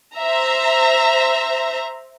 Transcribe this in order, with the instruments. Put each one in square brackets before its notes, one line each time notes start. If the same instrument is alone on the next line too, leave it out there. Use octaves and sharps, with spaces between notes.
[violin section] C5 E5 A#5